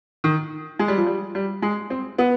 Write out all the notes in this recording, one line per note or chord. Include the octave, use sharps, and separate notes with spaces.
D#3
G#3
G3
F3
G3
G3
G#3
C4
B3